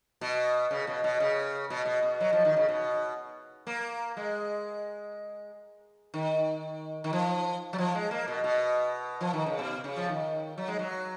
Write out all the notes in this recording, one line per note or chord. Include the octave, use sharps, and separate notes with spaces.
B2
C#3
B2
B2
C#3
B2
B2
B2
F#3
F3
D#3
C#3
B2
A#3
G#3
D#3
D#3
F3
F#3
F3
G#3
A#3
B2
B2
F3
D#3
C#3
B2
C#3
F3
D#3
F#3
G#3
F#3